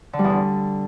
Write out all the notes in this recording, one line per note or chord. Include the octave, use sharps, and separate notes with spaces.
D3
G3
E2
D3